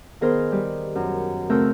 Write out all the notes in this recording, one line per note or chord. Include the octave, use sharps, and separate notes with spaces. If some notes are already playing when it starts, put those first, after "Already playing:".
D#3 B3 G#4 A#4 C5 A#5
G3
F#2
C#3 A3 C4 A#4 E6 G6